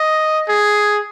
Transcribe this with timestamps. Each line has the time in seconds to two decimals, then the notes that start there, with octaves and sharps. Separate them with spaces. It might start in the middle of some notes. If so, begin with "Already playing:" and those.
Already playing: D#5
0.48 G#4